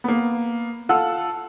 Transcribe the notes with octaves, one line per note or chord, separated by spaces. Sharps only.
A#3 B3
F4 A4 F#5 E6